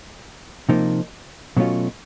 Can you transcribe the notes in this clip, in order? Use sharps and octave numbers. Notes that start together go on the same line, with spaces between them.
C3 F3 A#3 D#4
B2 F#3 A3 C#4 F4